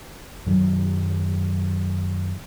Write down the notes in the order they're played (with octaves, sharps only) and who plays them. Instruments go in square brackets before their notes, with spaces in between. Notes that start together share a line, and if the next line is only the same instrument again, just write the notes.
[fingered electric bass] F#2 D#3 F#3